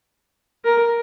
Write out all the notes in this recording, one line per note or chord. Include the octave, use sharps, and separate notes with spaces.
A#4